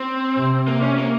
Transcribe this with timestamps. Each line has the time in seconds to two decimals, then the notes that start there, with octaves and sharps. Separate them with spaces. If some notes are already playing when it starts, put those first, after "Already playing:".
Already playing: C4
0.38 C3
0.67 A#3
0.82 C#4
0.98 A#3